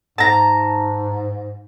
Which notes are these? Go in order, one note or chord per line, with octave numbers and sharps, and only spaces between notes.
G#2 A5 A#5